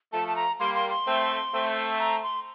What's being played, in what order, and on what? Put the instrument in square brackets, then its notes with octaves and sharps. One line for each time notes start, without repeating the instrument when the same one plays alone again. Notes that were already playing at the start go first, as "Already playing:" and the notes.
[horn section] F3 A3 [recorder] A5
[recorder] A5
A#5
[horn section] G3 A#3 [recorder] C6
[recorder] C6
C6
[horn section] A3 C4
A3 C4
[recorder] A#5
C6